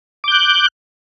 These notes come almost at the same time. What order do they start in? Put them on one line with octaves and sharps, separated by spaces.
D6 G6 F#6